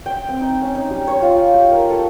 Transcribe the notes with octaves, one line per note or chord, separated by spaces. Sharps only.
G5
C4
D#4
C#4
D#4
G3
C#5
F4
G4
A#4
A4